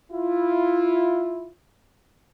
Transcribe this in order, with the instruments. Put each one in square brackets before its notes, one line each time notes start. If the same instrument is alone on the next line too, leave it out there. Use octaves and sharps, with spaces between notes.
[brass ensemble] E4 F4